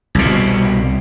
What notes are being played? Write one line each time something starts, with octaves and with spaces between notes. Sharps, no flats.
C2 B2